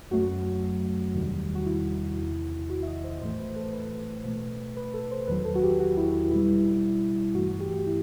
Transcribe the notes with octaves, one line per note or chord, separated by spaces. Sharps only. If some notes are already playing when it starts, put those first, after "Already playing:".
F#2 F#3 A3 F#4
E2 C3 D#3 G3
F#4
E4
E2 C3 D#3
F#4
E5
D#5
C5
A2 E3 A3 C5
B4
A4
B4
B2 A3
B4
A4
C5
E2 D#3 F#3 B4
A4
F#4
G4
F#4
E4
B2 G3 E4
G2 E3 A3 F#4
F#4
G4
F#4
E4